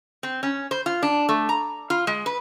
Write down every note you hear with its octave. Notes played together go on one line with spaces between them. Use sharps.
C4
C#4
C5
F4
D4
A3
A#5
F4
G#3
B4